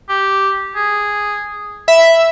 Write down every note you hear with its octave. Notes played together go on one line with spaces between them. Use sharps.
G4
G#4
E5 B5